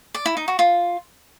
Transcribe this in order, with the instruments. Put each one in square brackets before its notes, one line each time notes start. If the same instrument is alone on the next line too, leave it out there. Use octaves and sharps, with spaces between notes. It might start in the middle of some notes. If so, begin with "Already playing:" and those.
[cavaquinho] D5
E4
D#4
F#4
F4